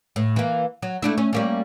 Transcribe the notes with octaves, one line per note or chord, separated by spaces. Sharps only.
A2
E3 A#3
F#3
A3 D4 E4
C#4
G3 A#3 C#4